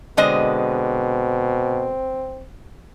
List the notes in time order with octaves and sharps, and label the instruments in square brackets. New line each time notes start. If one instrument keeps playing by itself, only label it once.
[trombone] B2 [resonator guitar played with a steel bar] D3 G#3 D#5 [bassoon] C4